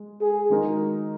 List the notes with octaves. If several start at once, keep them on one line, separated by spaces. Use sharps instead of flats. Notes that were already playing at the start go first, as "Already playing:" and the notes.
Already playing: G#3
G#4
D#3 G#3 D#4 F#4 A#4